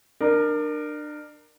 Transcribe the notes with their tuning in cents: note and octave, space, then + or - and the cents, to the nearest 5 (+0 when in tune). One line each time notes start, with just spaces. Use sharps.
D4 +30 A#4 +0